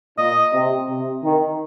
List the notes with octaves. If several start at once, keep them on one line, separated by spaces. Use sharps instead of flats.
A#2 D#5
C3
C3
D#3